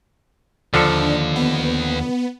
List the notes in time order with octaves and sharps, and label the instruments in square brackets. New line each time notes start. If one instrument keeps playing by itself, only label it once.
[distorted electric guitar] D#2 [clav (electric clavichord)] D3 F3 A4 [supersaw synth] D4
[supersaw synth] B3